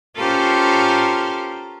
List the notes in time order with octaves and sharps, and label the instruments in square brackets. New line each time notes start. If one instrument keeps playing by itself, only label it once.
[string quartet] C#4 F4 G4 A4 A#4 C5